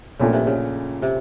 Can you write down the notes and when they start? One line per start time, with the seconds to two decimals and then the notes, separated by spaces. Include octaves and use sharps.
0.19 A#1 A#2 C#3 A3
0.33 C3
0.47 C#3
1.02 C3